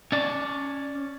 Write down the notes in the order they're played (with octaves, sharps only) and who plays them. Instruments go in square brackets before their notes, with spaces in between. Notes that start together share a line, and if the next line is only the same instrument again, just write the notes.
[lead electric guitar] C#4 D5